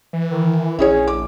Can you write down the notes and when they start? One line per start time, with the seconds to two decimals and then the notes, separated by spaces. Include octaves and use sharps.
0.13 E3
0.30 D#3
0.79 A#1 C#4 E4 G#4 C#5
1.08 D6